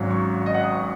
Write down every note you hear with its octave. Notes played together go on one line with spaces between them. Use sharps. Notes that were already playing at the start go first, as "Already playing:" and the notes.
Already playing: G#1 G#2 F#3 C#4
C#6
D#5
F#5
D#6
C#6